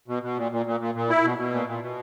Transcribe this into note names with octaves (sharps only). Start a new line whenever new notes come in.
B2
B2
A#2
A#2
A#2
A#2
A#2
E4
B2
B2
A#2
A#2
B2